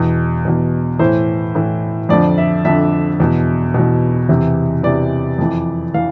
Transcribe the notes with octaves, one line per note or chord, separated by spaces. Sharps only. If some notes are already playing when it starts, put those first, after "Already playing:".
Already playing: E2 B2
E2 B2
A2 E3 C5
A2 E3
F2 D3 F3 D5
E5
F2 D3 F3 E5
E2 B2
E2 B2
E2 C3 E3
E2 C3 E3 D5
F2 E3
E3 F5